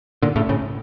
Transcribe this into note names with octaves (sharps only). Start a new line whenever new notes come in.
A#2 D3
A2 C#3
A2 C#3